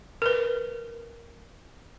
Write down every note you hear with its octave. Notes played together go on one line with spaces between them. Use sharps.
A#4 B4